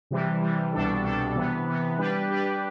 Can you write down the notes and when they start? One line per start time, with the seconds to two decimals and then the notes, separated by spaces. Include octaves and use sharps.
0.11 C3 E3 G3
0.42 C3 E3 G3
0.73 C2 B2 G3 D4 A4
1.04 C2 B2 G3 D4 A4
1.35 C3 E3 B3
1.66 C3 E3 B3
1.98 G3 D4 G4 B4
2.29 G3 D4 G4 B4